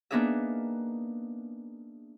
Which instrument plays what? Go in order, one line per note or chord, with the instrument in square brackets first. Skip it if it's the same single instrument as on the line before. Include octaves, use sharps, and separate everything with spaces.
[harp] A#3 B3 D4 D#4 G#4 E5